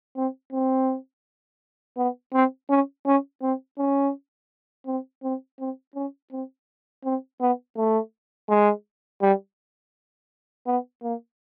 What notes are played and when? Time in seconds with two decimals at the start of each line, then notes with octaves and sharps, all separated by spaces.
0.16 C4
0.52 C4
1.97 B3
2.33 C4
2.69 C#4
3.06 C#4
3.42 C4
3.78 C#4
4.86 C4
5.23 C4
5.59 C4
5.95 C#4
6.31 C4
7.04 C4
7.40 B3
7.77 A3
8.49 G#3
9.22 G3
10.66 B3
11.03 A#3